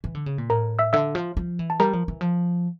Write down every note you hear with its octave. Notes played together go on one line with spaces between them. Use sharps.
E3
D3
C#3
A#2
A2 A#4 A#5
E5 E6
D3 E5 E6
F3
F3
E3
A5
G3 A#4 A#5
F3
E3
F3